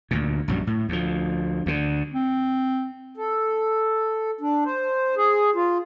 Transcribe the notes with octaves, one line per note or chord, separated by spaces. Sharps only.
D2 A#2
A#1 F#2 F#3 G3
A2
D2 F3
D2 D3
C4
A4
D4
C5
G#4
F4